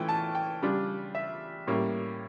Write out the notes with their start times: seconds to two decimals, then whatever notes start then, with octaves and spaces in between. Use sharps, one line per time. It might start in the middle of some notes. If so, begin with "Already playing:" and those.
Already playing: E3 A3 C#4 F4 G5
0.09 A5
0.35 G5
0.62 C#3 G3 D4 F4
1.15 E5
1.67 A2 G3 A#3 C#4